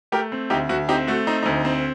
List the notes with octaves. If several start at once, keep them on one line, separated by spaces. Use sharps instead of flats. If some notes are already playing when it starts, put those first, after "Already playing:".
A3 G4 A#4
C4
D2 D#4 G4
D2 F#4
C4 D#4 G4
A3 F#4
C4 D#4
D2 D#4
C4